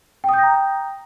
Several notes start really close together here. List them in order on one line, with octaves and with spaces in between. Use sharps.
G5 D#6 G6 A#6 A#5